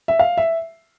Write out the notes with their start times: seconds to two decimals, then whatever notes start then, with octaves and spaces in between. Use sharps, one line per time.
0.08 E5
0.19 F5
0.37 E5